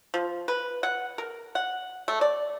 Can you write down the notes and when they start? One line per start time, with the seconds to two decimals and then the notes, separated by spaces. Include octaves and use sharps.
0.14 F3
0.48 B4
0.83 F#5
1.18 A#4
1.55 F#5
2.08 A3
2.21 D5